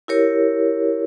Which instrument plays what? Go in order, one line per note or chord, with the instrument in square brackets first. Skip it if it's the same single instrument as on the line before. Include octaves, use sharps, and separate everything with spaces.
[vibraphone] E4 G4 A#4 C#5